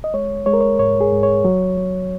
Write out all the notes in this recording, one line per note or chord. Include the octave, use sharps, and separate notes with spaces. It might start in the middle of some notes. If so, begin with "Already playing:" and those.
D#5
G#3 C#5
G#3 C#5
A#4
C#5
G#2 C#5
G#4
G#2
C#5
F#3
F#3